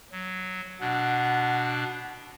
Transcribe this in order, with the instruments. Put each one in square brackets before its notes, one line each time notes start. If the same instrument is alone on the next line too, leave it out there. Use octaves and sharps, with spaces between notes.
[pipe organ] F#3
[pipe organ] B2 D4 [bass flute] F#5